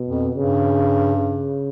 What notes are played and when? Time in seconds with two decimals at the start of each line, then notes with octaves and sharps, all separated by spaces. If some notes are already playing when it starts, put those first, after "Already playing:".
Already playing: B2
0.08 F2
0.35 G2 C#3
1.16 C#3